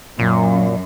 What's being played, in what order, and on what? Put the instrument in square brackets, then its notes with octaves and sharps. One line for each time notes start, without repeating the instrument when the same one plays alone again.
[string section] F#2 [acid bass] A#2